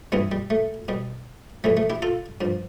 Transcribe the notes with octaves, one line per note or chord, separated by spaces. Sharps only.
G2 E3 G3 B3
G3
A3
B2 G3
F2 E3 G3 A3
A3
E4 G4
F4 A4
G2 F3